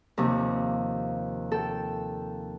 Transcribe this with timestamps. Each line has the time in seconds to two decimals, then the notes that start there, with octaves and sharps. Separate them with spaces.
0.18 D#2 C3 F3
1.52 A4 G5